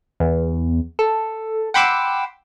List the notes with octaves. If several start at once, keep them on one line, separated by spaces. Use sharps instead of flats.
E2
A4
F#5 G5 B5 C6 D6 E6